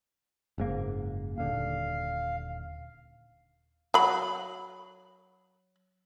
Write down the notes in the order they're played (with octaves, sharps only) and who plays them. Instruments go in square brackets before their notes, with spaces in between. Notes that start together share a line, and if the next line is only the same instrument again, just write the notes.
[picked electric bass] F#1 G#2 A#3
[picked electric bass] D#1 D3 [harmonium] F5
[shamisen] F#3 B5